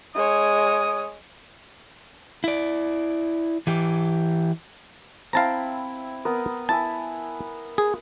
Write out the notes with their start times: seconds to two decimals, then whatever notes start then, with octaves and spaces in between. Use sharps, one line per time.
0.15 G#3 C#5 D#6
2.44 E4 D5
3.67 E3 G4
5.33 C4 E4 F5 G5 A5 A#5
6.25 B3 A#4 D#6
6.69 E4 E5 G#5 A5
7.78 G#4